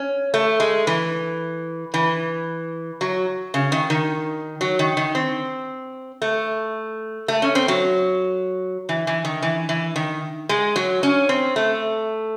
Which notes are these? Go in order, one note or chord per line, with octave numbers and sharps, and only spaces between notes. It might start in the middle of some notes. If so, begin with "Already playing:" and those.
Already playing: C#4
A3
G#3
E3
E3
F#3
C#3
D#3
D#3
F#3
D#3
D#3
C4
A3
A3
C#4
C4
F#3
E3
E3
D#3
E3
E3
D#3
G#3
F#3
C#4
C4
A3